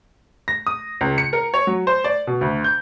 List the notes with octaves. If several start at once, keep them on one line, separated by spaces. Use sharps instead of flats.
A#6
D#6
C#2
C#7
A#4
C#5
F#3
C5
D5
B2
D2
G6